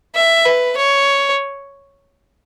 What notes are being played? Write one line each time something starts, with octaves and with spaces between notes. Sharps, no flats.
E5
B4
C#5